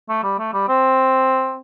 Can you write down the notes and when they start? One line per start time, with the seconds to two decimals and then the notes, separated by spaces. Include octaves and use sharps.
0.09 A3
0.23 G3
0.39 A3
0.53 G3
0.69 C4